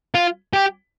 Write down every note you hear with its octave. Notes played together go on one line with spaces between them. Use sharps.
F4
G4